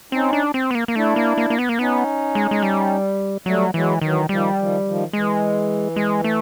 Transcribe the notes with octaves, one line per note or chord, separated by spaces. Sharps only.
C4 C#4 D#4
D4
C4
B3
A#3
A#3
A3 D4 E4
A#3
A#3
A#3
B3
A#3
B3 C#4 D#4
G#3
G#3
G3
F#3 G3 A3
E3 F#3 G#3
D#3 E3 F#3
D#3 F3 G3
D#3 F3
D#3 F3
E3 G#3
G#3
A3